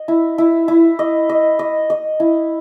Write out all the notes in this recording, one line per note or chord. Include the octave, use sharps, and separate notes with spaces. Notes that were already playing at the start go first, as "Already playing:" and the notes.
Already playing: D#5
E4
E4
E4
D#5
D#5
D#5
D#5
E4